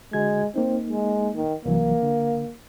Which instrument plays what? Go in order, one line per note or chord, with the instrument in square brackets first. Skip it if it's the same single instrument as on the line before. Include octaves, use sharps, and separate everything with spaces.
[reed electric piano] D3 F#4 G#6 [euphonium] G#3
[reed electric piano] A#3 D#4 [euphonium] C4
[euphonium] G#3
D#3
[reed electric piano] C2 E3 F#3 [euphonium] A#3
[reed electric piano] D3